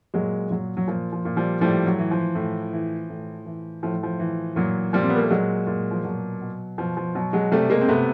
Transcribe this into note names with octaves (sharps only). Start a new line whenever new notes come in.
A#2 F#3 G#3
A#2 F#3
F#3
A#2 F3
F3
A#2
F3 G3
A2 F3 G3
F#3
E3
F3
A2
E3
A2
E3
A2 F3
F3
E3
A#2 F#3
A#2 F3 G3
C4
B3
A#3
A3
A#2 F#3 G#3
A#2
F3
B2 F#3
B2
B2 F3
F3
B2 F#3
F#3 G#3
C3 G3 A3
G#3 A#3
C4
C3 A3 B3